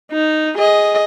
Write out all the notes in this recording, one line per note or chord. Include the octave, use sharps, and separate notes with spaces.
D#4
G#4 D#5